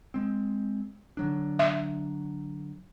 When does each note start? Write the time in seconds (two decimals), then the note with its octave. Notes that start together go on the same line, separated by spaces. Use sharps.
0.14 G#3 C4
1.17 D3 F#3 D4
1.59 E5